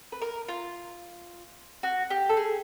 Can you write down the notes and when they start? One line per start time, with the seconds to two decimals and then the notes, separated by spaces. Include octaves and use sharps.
0.12 B4
0.22 A#4
0.48 F4
1.83 F#4
2.10 G4
2.29 A4
2.37 G#4